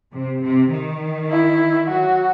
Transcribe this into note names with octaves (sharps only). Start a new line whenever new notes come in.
C3
C3
D#3
E4
F#3 F#4